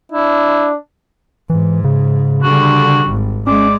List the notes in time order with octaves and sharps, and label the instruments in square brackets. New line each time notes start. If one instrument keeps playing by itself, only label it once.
[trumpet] D4 [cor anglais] E4
[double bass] G#2 [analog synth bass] E3
[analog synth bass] C#3
[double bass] D3 G3 [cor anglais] F#4
[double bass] G#1
[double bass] G#3 [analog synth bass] C#4 [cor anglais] D5